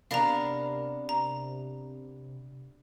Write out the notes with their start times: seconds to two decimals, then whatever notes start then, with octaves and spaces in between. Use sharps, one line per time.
0.11 C3 B3 D4 A#4 F5 A#5
1.09 A#5